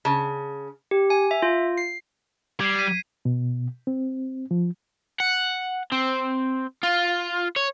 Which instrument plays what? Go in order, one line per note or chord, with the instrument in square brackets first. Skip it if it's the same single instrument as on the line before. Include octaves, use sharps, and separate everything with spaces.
[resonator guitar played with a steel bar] C#3 A5
[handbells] G4
G#5
E5
F4
C7
[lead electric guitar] G3 [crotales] G#6 C7
[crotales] G#6 B6 D#7
[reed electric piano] B2
C4
F3
[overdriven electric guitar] F#5
C4
F4
C#5